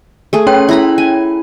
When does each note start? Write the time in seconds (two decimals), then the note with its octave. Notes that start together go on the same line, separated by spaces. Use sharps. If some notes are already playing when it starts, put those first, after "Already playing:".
0.33 A3 G#4
0.47 C#4 C#5 G5
0.69 E4 A#5 B5
0.98 G#5